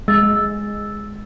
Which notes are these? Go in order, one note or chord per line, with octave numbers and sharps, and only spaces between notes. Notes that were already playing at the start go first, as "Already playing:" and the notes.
G#3 E6 A6